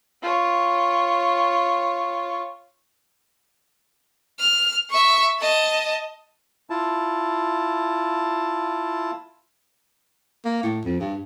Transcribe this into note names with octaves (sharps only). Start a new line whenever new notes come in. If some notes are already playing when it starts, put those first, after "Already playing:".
F4 C#5
F6
E5 C#6
D#5 A5
E4 F4 A5
A#3
A2
F2
G2